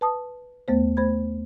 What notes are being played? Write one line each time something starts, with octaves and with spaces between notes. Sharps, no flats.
B4 A5 D#6
D#2 A3 B3 C5
A3 C5 B5 G#6